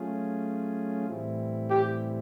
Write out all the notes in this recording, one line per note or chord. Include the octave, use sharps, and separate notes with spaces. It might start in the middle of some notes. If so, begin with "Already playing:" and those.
Already playing: F#3 A3 C#4 F4 G#4
A2 E3 G3 C4 E4
G4